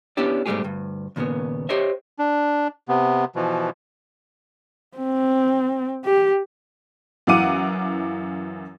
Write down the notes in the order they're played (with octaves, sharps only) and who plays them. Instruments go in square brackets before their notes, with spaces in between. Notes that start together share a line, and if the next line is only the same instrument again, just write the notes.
[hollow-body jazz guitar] B3 C#4 D4 E4 G4 D5
G#2 B2 G3 A3 G4 G#4
D2 G2
D#2 A#2 C#3 B3
G4 C5 C#5 D#5 E5
[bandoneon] D4
C3 B3
B2 E3 F3
[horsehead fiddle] C4
G4
[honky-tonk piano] F#2 E3 F5 F#5 D6 D#7